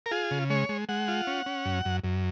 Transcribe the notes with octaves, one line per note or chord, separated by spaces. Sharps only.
A#4
F4 G#4
C#3
G#3 C#5
G#3
G#3 F#5
F4
C#4
C#4
F#2
F#2
F#2